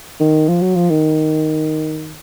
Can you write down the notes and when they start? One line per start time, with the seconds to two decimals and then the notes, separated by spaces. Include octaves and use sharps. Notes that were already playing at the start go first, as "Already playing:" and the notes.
0.20 D#3
0.48 F3
0.62 F#3
0.76 F3
0.90 D#3